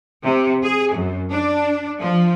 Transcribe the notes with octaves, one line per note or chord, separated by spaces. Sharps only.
C3
G#4
F#2
D4
F3